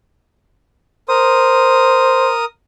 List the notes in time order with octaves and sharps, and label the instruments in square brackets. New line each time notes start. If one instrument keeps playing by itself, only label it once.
[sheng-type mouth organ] A#4 D#6 [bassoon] C5